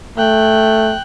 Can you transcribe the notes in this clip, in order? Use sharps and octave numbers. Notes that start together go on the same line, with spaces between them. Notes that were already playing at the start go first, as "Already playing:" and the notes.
A3 G5 F#6